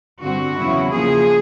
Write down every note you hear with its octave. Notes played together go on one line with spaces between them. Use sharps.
G2 D3 G3 C4 F#4
E2 C#3 F#3 B3 E4
C#3 F3 A#3 G#4